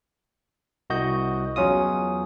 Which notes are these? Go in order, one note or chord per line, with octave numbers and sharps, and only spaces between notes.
C2 F#4 D#5 G6
E2 F#3 C#4 F4 D#6